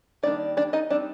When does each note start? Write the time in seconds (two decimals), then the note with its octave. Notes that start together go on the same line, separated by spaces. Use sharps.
0.23 D#3 G3 A#3 D4 D5
0.57 D4 D5
0.73 D#4 D#5
0.90 G3 C4 D4 D#4 D5